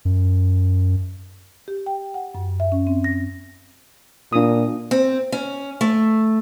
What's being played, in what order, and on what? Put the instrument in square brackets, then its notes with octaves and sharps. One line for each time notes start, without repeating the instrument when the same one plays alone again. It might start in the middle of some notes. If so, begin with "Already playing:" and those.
[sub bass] F#2
[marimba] G4
G5
F#5
F#2
E5
C#4
C4
A#6
[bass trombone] A#2 [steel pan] D4 D#6
[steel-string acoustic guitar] C4
C#4
A3